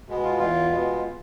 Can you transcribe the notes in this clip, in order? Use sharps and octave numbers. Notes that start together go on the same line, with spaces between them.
B2 G#3 B3
F4
E2 F4
B2 G#3 B3